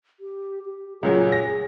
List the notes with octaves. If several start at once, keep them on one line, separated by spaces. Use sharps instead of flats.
G4
G4
C#2 A#2 F#3 G#4 C#5
A#6